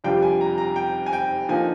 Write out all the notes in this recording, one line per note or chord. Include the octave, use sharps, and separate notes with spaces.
F2 C3 G3 D4 F4 G5
G#5
A#5
A#5
G5
G#5
G5
D3 F3 A#3 D#4 G#5